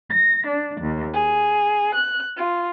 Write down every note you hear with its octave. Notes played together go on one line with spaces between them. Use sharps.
A#6
D4
D#2
G#4
F#6
F4